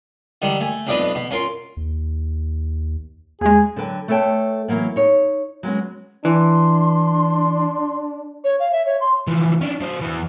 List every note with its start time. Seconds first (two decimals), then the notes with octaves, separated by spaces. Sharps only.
0.42 D3 D#3 G3
0.60 A3 G#5
0.87 B1 F2 B2 D4 B4 D#5
1.15 B2
1.31 C#4 F4 A#4 C6
1.77 D#2
3.41 D#2 G#3 G#4
3.76 D3 F#3 B4 G5
4.08 A3 A4 B4 C#5 G5 A5
4.68 E3 F#3 A#3 B3
4.96 D#4 C#5
5.63 F#3 G#3 B3 C#4
6.25 E3 D4 C6
8.44 C#5
8.60 F5
8.72 E5
8.86 C#5
9.01 C6
9.27 E3 F3
9.61 C#4 D4
9.81 F#3 C5
10.01 E2 E3